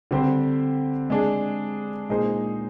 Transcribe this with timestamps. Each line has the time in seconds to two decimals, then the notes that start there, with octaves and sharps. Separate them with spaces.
0.11 D3 G3 C4 G4 C5
1.10 G#3 D4 G#4
2.09 A#2 G#3 D#4 G#4 C5